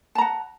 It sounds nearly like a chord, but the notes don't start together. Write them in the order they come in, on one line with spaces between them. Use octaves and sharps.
A5 A#5 F#5